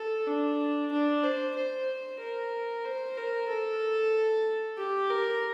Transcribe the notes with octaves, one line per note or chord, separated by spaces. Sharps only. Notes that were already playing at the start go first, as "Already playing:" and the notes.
Already playing: A4
D4
D4
C5
C5
A#4
C5
A#4
A4
G4
A#4